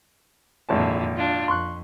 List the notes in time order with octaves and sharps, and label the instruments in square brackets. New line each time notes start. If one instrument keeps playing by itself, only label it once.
[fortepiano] G#1 E4 A5 [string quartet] F2 A#2 D3
[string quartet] D4 F4
[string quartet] F2 [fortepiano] C6 C#6 F#6